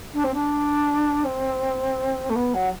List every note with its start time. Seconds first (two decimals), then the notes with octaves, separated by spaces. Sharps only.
0.13 D4
0.24 C4
0.34 D4
1.24 C4
2.29 A3
2.35 B3
2.54 F#3